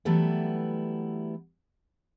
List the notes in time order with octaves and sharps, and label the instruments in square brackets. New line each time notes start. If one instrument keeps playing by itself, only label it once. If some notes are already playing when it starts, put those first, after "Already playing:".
[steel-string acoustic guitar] E3 F#3 G3 A3 B3 E4